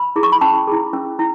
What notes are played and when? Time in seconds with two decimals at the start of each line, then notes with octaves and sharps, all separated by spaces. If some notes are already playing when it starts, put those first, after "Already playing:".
Already playing: B5
0.16 E4 G#4
0.23 C#6
0.32 B5
0.41 C#4 A5
0.67 E4 G#4
0.93 C#4
1.19 E4